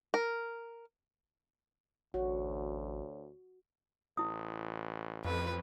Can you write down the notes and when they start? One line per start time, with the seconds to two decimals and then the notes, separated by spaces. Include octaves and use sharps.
0.14 A#4
2.14 A1 D2 F#4 C#5
4.17 A1 E4 D#6
5.25 F2 B4